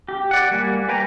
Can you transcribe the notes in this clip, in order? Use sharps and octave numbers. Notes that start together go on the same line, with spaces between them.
G4
D5 F#5
G3 A#3 G#5
B4 G5 G#5 A#5